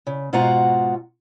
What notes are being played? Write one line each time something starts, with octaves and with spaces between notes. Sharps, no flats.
C#3
G#2 B2 F4 F#4 F#5 A#5